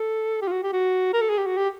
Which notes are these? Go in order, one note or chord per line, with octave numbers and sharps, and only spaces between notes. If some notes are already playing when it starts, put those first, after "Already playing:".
Already playing: A4
G4
F4
F#4
G4
F#4
A#4
A4
G#4
G4
F#4
G4